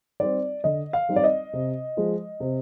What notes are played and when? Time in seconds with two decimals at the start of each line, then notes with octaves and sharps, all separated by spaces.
0.20 G3 C4 D#4 D5
0.64 D3 D#5
0.93 F5
1.09 G3 C4 D#4
1.16 D5
1.24 D#5
1.53 C3
1.97 F3 G#3
2.40 C3